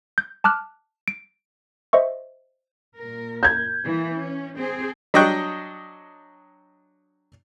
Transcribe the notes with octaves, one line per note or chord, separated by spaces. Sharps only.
G6
A5 D6 F6 F#6
D7
C5 D#5 E5 C#6
A#2 A#4
G6 G#6
E3 A#3
C#4
C4 G#4 C5
F#3 D4 D#5 G5 C#6 F#6